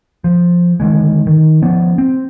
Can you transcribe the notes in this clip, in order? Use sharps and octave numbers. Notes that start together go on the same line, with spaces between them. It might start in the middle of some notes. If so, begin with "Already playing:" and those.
F3
D3 D#3 G#3
D#3
F3 B3 C#4
C4